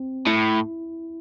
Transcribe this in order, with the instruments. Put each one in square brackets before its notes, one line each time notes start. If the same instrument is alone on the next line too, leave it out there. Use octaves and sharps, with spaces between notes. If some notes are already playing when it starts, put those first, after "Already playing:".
Already playing: [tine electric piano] C4
[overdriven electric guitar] A2 [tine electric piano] E4